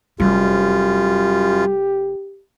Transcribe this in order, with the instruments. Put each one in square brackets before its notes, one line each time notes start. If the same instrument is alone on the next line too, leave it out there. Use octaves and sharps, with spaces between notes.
[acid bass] F1 [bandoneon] F#2 F4 [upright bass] G3 [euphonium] G4